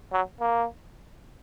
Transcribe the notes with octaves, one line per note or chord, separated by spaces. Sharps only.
F#3
A#3